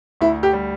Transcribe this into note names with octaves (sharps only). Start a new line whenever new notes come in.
D2 E4
G4
G3